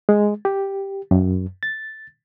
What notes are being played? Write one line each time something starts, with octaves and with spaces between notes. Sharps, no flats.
G#3
G4
F#2
A6